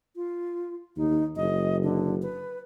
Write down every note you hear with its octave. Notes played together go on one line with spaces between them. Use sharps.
F4
D#2 D#4
F#1 D#5
D3
B4